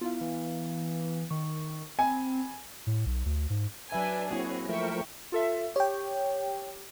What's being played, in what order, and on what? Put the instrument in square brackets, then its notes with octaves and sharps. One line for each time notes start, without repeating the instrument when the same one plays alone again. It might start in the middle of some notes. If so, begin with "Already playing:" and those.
[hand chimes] B3 E4 F5 [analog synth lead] F4
[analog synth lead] E3
[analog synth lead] D#3 [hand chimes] C#6
[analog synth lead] C4 [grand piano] G#5 [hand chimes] B5
[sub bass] A2
B1
D2
G#2
[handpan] F#3 E5 [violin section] D4 B4 G#5
[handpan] A#3 E4 [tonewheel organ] C4 F#4 [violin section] G#4 C#5
[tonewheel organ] F3 A3 A#4 [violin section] E5 G5 C#6
[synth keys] F4 A4 E5
[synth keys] G4 [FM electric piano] C#5 G5